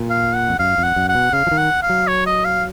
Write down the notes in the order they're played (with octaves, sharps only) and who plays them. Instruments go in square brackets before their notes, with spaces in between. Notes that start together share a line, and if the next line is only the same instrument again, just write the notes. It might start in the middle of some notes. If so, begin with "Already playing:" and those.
Already playing: [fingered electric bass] A#2
[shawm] F5
F#5
[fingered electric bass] F2
[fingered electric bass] F#2 [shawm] F5
[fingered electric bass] F2
[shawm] F#5
[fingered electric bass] F#2
[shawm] F#5
[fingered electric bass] B2
[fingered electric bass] C#3 [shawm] F5
[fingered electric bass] F3
D#3
[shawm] F#5
F5
[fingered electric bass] F#3
[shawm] C#5
D#5
F5